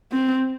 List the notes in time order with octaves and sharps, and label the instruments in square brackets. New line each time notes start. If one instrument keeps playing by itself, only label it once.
[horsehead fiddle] C4